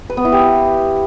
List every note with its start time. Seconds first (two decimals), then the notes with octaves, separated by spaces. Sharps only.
0.10 B4
0.17 B3
0.25 E4
0.32 G4